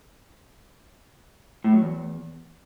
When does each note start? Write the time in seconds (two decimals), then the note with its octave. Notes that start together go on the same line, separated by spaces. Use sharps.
1.64 A2
1.73 F#3
1.82 E2